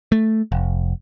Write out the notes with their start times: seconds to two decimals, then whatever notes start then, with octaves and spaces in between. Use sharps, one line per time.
0.12 A3
0.52 F1